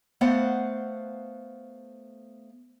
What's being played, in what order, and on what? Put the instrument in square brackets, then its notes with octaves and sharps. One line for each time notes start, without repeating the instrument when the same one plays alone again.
[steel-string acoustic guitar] A3 B3 C5 F5 F#5